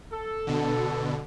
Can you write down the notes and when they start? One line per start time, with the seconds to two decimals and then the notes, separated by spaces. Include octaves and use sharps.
0.12 A4
0.47 B2 D3